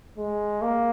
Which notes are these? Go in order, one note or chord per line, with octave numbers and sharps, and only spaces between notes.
G#3
A#3